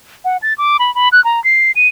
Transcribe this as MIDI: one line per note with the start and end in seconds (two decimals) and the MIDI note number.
0.25 0.37 78
0.42 0.54 93
0.58 0.77 86
0.79 0.93 83
0.95 1.09 83
1.12 1.23 90
1.24 1.43 82
1.44 1.72 96
1.76 1.88 99